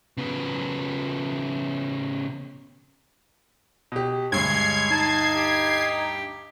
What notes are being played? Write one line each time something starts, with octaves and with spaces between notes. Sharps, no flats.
C#3 B3
B2 G4
D2 G2 G#3 C#5 G#6 C7
D#4 A5
G4